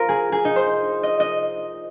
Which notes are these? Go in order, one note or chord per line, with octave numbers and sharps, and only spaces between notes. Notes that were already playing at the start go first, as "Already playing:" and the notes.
Already playing: F4 A#4 C5
G#4
G#4
D#4
C5
D#5
D#5